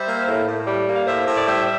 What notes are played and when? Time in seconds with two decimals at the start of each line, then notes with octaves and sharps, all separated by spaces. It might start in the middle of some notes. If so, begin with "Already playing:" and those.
Already playing: G3 C5 E5
0.09 A#3
0.28 A2
0.48 A2
0.67 G3
0.87 A#3
0.94 F5
1.07 A2 C5 E5
1.27 A2
1.37 D5
1.47 G3 C5 E5